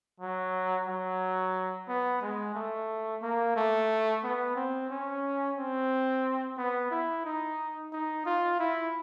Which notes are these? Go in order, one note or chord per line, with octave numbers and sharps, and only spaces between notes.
F#3
F#3
B3
G#3
A3
A#3
A3
B3
C4
C#4
C4
B3
E4
D#4
D#4
F4
E4